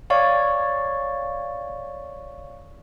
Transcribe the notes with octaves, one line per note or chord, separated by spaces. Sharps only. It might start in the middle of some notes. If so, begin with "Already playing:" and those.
C#5 D5 F5 C#6